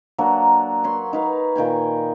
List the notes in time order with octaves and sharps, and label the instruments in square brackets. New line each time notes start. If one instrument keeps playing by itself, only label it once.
[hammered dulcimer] F#3 A#3 D4
C#5 B5 C6
D#4 B4 F5
A#2 D#3 G5 G#5